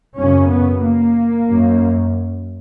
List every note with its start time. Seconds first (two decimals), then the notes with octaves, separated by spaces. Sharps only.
0.18 F#2 C#3 C#4
0.50 B3
0.84 A#3
1.48 F#2